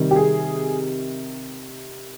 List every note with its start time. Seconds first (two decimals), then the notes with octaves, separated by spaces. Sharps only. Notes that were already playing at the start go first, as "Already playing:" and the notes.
Already playing: C3 D#3 G3
0.11 G4
0.16 G#4